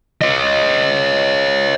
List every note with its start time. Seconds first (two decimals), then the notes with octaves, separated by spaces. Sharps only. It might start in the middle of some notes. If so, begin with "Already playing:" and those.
0.22 C#5 D#5